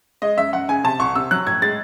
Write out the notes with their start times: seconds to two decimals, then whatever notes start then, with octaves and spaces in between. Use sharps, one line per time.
0.22 G#3 D#5
0.37 F#2 E5
0.53 F#2 F#5
0.68 C#3 G#5
0.84 C3 A5
1.00 C2 C#6
1.15 C3 E6
1.31 F#3 F#6
1.46 A2 G#6
1.62 G#3 A6